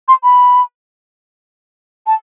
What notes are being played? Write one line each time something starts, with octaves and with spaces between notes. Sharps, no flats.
C6
B5
A5